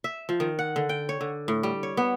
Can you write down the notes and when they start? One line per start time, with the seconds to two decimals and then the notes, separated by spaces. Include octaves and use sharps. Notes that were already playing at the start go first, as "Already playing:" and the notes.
0.04 E5
0.29 F3
0.40 D#3
0.59 F#5
0.76 D3
0.89 G5
1.09 C#5
1.21 D3
1.48 A2
1.63 G3
1.83 C#5
1.97 B3